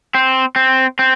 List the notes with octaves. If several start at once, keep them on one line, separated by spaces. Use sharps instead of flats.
C4
C4
C4